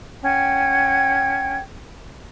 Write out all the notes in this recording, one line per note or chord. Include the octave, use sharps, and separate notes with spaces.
C#4 F#5 G5 G#6